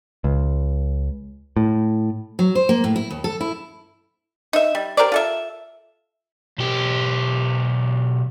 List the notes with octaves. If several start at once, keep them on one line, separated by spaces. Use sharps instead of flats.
C#2
A2
F#3
C5
A#3
A2
E4
D#2
A4
E4
D#4 E5
G3
G4 A#4 C5 D5
F4 A4 E5
B1 G4